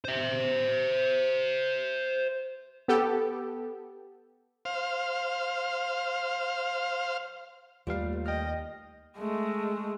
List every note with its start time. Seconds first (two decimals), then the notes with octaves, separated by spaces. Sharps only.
0.04 C5 E5
2.88 B3 G4 A4
4.65 C5 F5
7.87 D#2 G3 A3 F4 B4 F5
8.26 D#5 G5 F6
9.18 G#3 A3